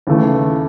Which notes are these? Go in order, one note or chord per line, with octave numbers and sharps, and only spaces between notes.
D#2 C#3 E3 A3